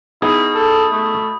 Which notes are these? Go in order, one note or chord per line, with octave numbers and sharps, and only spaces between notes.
B2 B3 D#4 E4 G#4 D#6
A4
A3